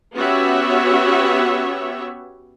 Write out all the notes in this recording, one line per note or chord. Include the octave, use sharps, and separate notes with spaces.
B3 C#4 F#4 G4 C#5 E5